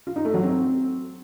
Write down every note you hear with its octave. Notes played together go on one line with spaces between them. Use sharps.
F4
D#4
A3
F#3
C4